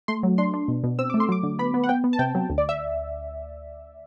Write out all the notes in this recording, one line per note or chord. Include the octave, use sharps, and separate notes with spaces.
A3 C6
F#3
D4 C6
D4
B2
B2
C4 E6
A3 D6
C6
F#3 D6
D3
B3 B5
B3
F#5
B3 G5
B3
A5
C3 G5
F#3
D2
D5
E5